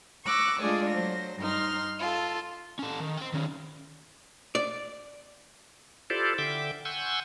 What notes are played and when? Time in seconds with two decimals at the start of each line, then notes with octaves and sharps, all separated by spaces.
0.24 C#6 D6 E6 F#6 A#6
0.60 G#3 A3 D4 F4 G#4 D5
0.89 F#3 C5 A#6
1.39 G2 D#4 C6 F6
1.98 F4 A4
2.79 C#4 A4
3.00 D#3
3.17 C5 G5
3.33 D#3 C#4
4.55 D5
6.10 E4 F4 G4 A4 C5 D5
6.38 D3 E5 G5 D6
6.85 F#5 G#5 C6 C#6 E6 G6